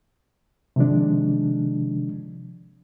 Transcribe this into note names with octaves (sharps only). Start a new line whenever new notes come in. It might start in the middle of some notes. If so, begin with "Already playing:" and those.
C3 D#3 F3 G#3 D4